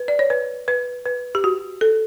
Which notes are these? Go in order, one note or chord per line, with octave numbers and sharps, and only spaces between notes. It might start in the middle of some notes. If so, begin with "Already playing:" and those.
Already playing: B4
D5
C#5
B4
B4
B4
G4
F#4
A4